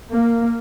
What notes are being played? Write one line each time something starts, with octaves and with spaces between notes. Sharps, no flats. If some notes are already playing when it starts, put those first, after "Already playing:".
A#3